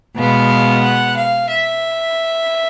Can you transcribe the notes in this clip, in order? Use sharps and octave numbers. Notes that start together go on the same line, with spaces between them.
B2 G#3 B3 F5
F#5
F5
E5